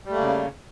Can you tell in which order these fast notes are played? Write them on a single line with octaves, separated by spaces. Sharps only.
G3 A3 A#3 C#3